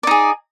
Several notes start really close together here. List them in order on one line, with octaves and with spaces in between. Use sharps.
D5 D#4 G#4